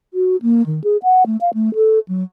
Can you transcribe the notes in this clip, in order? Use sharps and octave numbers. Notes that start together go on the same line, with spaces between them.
F#4
A#3
D#3
G#4
F#5
A3
F5
A3
A4
F#3